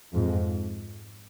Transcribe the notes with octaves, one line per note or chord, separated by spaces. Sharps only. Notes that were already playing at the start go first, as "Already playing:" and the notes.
F2 G#2